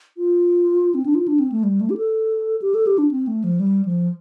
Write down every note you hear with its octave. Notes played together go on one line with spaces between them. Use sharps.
F4
C4
D4
F4
D4
C4
A3
G3
A3
G4
A4
G4
A4
G4
D4
C4
A3
F3
G3
F3